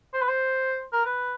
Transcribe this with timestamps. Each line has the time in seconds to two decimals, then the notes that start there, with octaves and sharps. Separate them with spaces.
0.14 C5
0.22 B4
0.28 C5
0.93 A#4
1.05 B4